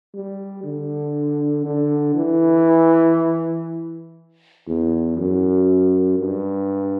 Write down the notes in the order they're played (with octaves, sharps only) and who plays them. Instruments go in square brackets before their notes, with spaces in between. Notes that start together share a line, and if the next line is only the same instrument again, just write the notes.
[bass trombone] G3
D3
D3
E3
E2
F#2
G2